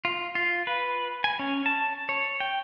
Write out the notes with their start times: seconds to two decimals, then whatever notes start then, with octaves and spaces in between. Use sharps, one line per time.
0.05 F4
0.35 F4
0.67 B4
1.24 G#5
1.39 C#4
1.66 A5
2.09 C#5
2.40 G5